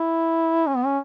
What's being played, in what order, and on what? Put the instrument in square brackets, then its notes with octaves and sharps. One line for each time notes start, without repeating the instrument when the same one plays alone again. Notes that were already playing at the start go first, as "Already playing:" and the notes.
Already playing: [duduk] E4
C#4
B3
C#4